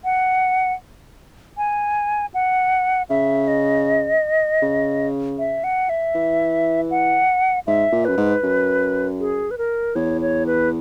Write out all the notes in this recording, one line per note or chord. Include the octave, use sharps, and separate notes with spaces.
F#5
G#5
F#5
C#3 E5
D#5
C#3
E5
F#5
E5
E3
F#5
G#2 E5
A#2
F#2 B4
G#2
F#2
G#4
B4
A#4
E2 C#5
C#5
B4